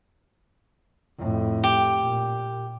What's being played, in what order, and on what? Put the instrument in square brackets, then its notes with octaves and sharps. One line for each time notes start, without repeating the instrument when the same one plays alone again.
[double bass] F2 A2
[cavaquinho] G4
[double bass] A#2